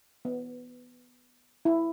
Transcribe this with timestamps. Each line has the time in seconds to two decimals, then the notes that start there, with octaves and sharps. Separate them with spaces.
0.25 B3
1.65 E4